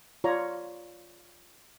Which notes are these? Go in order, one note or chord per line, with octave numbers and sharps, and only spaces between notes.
F4 C#5 D5 A#5